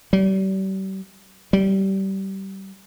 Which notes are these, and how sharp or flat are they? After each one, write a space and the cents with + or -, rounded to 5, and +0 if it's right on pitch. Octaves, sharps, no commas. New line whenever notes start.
G3 -40
G3 -20